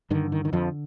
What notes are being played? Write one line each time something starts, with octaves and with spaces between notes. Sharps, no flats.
G2 D3 D#3
D#3
D#3
F2 F3